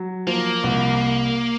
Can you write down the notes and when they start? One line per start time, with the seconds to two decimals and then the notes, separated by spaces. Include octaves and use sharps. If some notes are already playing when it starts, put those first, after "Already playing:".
Already playing: F#3
0.27 F3 A#3
0.64 C2